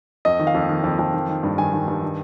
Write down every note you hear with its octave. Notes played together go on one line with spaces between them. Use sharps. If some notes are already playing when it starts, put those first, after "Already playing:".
F2 D#5
D#3
F5
F2
D#3
F2
F2
D#3
D#3
G2
D#3 G#5
D#3
G2
D#3